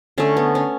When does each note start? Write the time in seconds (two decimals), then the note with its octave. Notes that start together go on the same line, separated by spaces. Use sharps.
0.18 D3 A3 C#4
0.37 B3
0.55 C#4